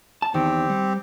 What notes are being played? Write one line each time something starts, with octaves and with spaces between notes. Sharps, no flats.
A5
E2 D#3 C4 G4
G3